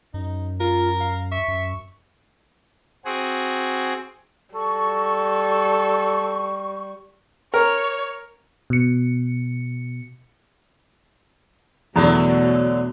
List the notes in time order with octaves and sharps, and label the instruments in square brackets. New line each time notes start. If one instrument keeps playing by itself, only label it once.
[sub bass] F#2 [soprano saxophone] D#4
[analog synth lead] F4 [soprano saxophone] A#4
[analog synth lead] F5
[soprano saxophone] E5 [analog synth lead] C#6
[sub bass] F#2
[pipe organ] C4 F#4 G#4
[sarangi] G3 [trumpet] A4 [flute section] C#6
[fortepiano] A#4 [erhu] C#5
[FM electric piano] B2 C#7
[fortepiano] E2 [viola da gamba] B2 A3 [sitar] D3 F#3